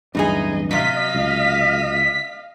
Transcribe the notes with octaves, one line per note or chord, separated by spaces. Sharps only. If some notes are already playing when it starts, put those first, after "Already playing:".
D1 A1 E2 G2 D#4 G#4 D#5
C3 F#3 D#5 F5 B6
C#2